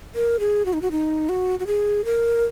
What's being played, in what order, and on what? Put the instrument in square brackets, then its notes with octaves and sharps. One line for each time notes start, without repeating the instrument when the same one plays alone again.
[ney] A#4
G#4
F#4
D#4
F#4
D#4
F#4
F#4
G#4
A#4